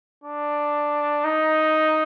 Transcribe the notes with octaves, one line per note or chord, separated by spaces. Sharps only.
D4
D#4